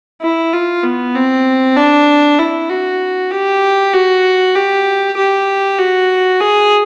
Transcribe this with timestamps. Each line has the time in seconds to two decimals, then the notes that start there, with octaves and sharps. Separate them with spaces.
0.21 E4
0.53 F4
0.83 B3
1.15 C4
1.76 D4
2.39 E4
2.70 F#4
3.31 G4
3.93 F#4
4.55 G4
5.16 G4
5.78 F#4
6.40 G#4